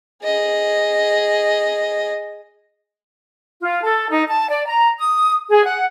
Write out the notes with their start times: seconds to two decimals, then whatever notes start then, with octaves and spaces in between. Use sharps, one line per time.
0.23 G#4 D#5
3.61 F4
3.83 A4
4.09 D#4
4.28 A5
4.49 D5
4.67 A#5
4.98 D#6
5.49 G#4
5.65 F#5